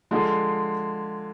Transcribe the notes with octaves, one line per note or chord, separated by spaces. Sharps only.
D3 F3 G#3